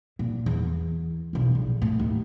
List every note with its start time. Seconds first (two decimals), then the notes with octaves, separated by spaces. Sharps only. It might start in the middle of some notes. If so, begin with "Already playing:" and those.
0.19 A#2
0.46 E2
1.33 B1 F2
1.55 A#1
1.82 A2
1.99 D#2